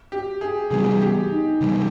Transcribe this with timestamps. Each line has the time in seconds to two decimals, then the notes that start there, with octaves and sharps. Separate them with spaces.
0.12 G4
0.41 G#4
0.70 C3 E3 G3 B3 G#4
1.01 G4
1.30 D#4
1.60 C3 E3 G3 B3